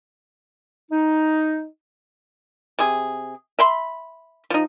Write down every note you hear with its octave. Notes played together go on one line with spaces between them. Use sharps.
D#4
C3 G#4
E5 B5 C6
F3 D#4